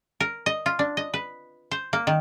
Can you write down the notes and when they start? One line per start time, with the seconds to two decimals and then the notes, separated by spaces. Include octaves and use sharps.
0.20 A#4
0.46 D#5
0.66 F4
0.79 D4
0.97 D#5
1.14 B4
1.71 C5
1.93 A#3
2.07 D#3